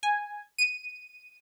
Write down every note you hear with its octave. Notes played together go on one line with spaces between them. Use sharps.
G#5
D#7